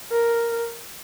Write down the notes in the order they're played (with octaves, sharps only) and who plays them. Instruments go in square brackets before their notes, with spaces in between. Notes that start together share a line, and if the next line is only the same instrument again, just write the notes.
[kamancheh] A#4